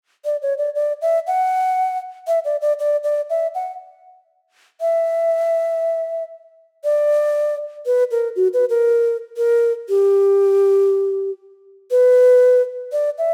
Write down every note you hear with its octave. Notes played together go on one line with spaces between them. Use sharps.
D5
C#5
D5
D5
E5
F#5
E5
D5
D5
D5
D5
E5
F#5
E5
D5
B4
A#4
F#4
B4
A#4
A#4
G4
B4
D5
E5